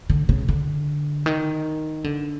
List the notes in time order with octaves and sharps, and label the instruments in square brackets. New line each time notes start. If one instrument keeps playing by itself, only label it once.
[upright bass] D3
C#3
D3
D#3
D3